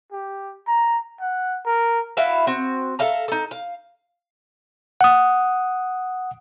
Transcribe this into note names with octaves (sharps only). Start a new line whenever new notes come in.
G4
A#5
F#5
A#4
E4 F#4 E5 F5
C4 F#4
A4 E5 F5 A#5
D#4 A4
F5
F#5 D#6